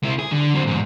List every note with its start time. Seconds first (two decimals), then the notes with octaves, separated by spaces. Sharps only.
0.03 C3 E4
0.19 G#4
0.32 D3
0.54 F#3 C4
0.67 E2 G#2